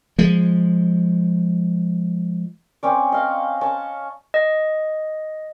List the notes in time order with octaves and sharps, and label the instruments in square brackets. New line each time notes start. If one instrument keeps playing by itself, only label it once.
[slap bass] F3 G#3
[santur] C4 C#4 D5
D#5 F5
C#4 A5
[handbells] D#5